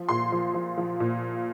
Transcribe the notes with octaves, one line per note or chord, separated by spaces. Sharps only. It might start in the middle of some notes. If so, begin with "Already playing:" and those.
Already playing: F3
A#2 C6
F3
F3
F3
A#2